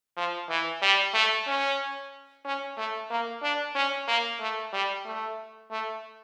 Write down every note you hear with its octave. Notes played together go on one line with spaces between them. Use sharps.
F3
E3
G3
A3
C#4
C#4
A3
A#3
D4
C#4
A#3
A3
G3
A3
A3